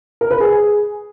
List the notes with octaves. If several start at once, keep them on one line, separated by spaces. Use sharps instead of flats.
A#4
B4
G#4